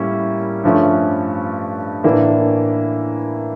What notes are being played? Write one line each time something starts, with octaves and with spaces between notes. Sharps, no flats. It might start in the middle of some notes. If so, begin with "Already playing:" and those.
Already playing: A2 G3 A#3 C#4 E4
G2 F3 A3 C#4
A2 E3 A#3 D4